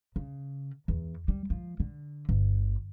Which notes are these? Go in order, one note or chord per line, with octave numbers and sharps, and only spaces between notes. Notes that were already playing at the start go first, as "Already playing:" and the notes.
C#3
E2
G3
F3
D3
G1